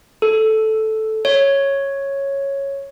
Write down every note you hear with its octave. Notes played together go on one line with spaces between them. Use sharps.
A4
C#5